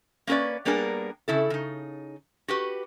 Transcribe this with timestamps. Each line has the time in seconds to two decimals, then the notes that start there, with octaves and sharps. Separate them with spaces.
0.27 A#3 C#4 A#4 B4 D5
0.65 G3 A#3 B3 D4 G#4 A#4
1.28 C#3 E4 A4
1.50 C#3 D#4
2.48 F#4 G4 B4